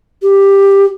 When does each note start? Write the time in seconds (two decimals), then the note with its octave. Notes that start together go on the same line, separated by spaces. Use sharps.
0.22 G4